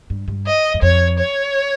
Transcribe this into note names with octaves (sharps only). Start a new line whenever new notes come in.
G2
G2
D#5
F#2
F2 C#5
C#5